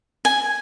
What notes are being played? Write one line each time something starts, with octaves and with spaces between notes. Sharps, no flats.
G#5